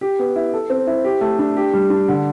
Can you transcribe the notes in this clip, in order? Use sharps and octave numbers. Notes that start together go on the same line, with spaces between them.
G4
B3
E4
A4
C4
E4
G4
A3
D4
G4
G3
D4
D3